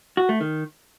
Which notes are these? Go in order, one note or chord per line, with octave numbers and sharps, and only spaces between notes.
F#4
A3
D#3